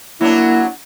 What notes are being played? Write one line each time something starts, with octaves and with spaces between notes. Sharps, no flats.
F#3 A#3 D4 E4